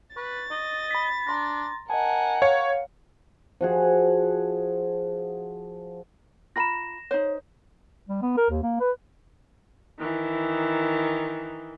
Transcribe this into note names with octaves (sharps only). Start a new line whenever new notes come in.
B4 C#6 A6
D#5
B5 B6
D4 A#5 C6 A#6
A#4 D#5 F#5 G#5 A5
C#5 F5 C#7
F3 F#4 G#4
F4 A#5 B5 A#6 E7
D#4 C5 C#5
G3
B3
A#4
D#2
A#3
B4
D#3 E3